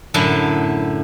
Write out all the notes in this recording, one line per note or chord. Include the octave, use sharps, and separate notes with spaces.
F#2 A2 D3 F#3 E4 A5